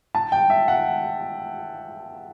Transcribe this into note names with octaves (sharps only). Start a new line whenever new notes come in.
A5
G5
E5
F#5